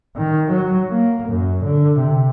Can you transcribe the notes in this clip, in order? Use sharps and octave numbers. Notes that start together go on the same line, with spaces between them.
D#3
F#3
A#3
F#2
D3
C3